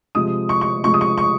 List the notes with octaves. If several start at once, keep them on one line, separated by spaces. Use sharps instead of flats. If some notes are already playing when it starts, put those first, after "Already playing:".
C3 F3 G#3 D#6
C#6
C#6
C3 F3 G#3 C#6
D#6
C#6
C#6